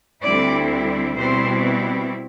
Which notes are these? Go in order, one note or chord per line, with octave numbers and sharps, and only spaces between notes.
D2 D3 G3 C4 E4 D5
B2 G3 C4 E4 C5